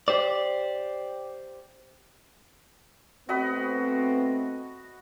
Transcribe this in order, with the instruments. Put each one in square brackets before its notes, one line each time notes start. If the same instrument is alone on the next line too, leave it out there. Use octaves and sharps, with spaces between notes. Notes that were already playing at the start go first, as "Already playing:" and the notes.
[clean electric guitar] G4 C5 D5
[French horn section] A3 B3 C4 [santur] F#4 D#5 B5